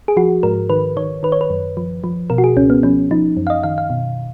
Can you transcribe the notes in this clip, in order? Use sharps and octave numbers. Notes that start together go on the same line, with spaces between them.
G#4
F3 F#4
G#2 A#4
D#3 B4
D#3 C#5
D#3 B4
C#5
B4
F#2
F3
F3
B2 A#4
F#4
G#4
C#2 C#4
B3
F3 C#4
F3 D#4
F#2
F5
D#5
D#3 F5
F5
B2